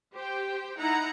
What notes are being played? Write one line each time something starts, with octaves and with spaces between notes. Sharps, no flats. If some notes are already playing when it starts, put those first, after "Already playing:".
G4 C5 G5
D#4 E4 F#5 A#5